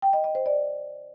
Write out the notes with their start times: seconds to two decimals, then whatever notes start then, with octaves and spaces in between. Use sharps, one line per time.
0.02 G5
0.13 D#5
0.24 D#5
0.35 C5
0.46 D5